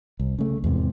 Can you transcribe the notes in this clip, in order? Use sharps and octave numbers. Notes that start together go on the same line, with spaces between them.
C2
C#3 A3
E2 G#2 C3